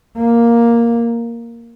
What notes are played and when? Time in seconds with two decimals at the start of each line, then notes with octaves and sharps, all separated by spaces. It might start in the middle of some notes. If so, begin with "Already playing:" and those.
0.17 A#3